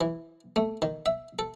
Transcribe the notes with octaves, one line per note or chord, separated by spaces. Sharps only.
E3
A3
D#3
E5
A4